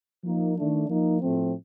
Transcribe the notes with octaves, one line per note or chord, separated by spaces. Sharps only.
F3 A#3 D#4
D#3 A3 D4
F3 A#3 D#4
A2 F3 A3 C4